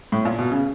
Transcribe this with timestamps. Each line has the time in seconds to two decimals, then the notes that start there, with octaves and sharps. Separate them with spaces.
0.12 A2
0.25 A#2
0.39 B2
0.52 C#3